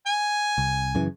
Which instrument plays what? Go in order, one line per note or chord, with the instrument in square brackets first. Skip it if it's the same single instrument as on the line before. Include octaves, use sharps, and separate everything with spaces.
[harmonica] G#5
[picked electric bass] C2
F#2 C#3 E3